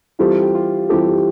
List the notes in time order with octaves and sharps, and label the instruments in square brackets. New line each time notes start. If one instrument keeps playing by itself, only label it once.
[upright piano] E3 G3 C4 F4 A4 [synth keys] G4
[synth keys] G4
F4
[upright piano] E3 G3 C4 F4 A4 [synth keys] G4